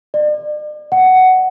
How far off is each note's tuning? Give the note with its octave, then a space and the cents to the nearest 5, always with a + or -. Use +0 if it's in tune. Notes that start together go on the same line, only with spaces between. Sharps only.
D5 +40
F#5 +10